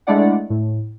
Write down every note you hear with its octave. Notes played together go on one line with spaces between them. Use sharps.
G#3 A3 D4 E4 D5 F#5
A2